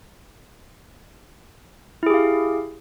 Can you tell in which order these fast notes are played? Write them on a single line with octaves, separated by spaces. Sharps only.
E4 G#4 G4 F5